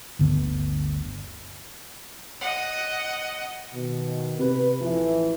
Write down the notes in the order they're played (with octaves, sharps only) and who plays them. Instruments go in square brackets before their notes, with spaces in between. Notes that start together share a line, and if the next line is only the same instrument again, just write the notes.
[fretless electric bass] G1 D2 D3 B3
[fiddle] D#5 F#5
[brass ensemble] B2 D#3
[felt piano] C3 [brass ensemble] B4
[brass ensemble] A1 E3 [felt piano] F3